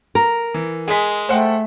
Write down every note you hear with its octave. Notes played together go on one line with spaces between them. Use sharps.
A#4
E3
G#3 G#4 B6
A3 C5 F#5 G5